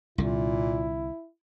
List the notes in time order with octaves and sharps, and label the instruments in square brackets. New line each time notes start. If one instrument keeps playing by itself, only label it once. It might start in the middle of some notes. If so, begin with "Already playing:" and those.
[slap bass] C2 D3 [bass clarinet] A#2 [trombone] E4